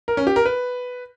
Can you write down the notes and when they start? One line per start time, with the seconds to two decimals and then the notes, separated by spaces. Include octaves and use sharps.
0.08 A#4
0.17 C#4
0.27 G4
0.36 A#4
0.45 B4